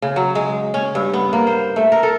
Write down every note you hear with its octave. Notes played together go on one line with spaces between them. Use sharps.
C#3
F#3
G#3
C#4
G2
B3
A#3
C5
A3
A#4
A4